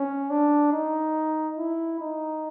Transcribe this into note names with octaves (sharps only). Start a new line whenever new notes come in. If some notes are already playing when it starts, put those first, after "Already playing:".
Already playing: C#4
D4
D#4
E4
D#4